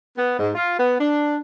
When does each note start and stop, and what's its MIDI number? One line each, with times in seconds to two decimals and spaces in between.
0.17 0.37 59
0.40 0.51 44
0.55 0.76 65
0.78 0.96 59
0.99 1.37 62